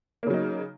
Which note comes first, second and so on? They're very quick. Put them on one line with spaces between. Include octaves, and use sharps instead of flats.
A#3 C#3 F#3 D#4